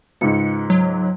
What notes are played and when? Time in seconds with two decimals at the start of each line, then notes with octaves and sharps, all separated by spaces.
0.21 C#2 G#2 C#7
0.70 F#3